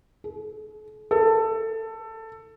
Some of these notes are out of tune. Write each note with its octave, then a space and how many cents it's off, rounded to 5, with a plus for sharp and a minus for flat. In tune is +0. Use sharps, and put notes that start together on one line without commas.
A4 -45
A4 +15